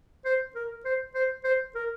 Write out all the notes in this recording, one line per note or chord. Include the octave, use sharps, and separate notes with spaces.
C5
A#4
C5
C5
C5
A#4